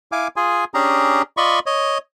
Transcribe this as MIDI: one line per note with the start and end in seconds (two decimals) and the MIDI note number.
0.12 0.28 64
0.12 0.28 77
0.12 0.28 80
0.12 0.28 86
0.36 0.65 65
0.36 0.65 68
0.36 0.65 80
0.74 1.22 61
0.74 1.22 62
0.74 1.22 67
0.74 1.22 68
0.74 1.22 82
1.37 1.59 65
1.37 1.59 74
1.37 1.59 75
1.37 1.59 83
1.37 1.59 85
1.66 1.98 73
1.66 1.98 75